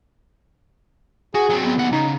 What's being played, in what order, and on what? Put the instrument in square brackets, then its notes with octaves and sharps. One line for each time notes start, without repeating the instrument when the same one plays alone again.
[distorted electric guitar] F#4 [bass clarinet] G#4
[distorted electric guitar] F#3 C4
[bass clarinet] B3
[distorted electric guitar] D#2 F#5
[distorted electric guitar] C#3 [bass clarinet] D#4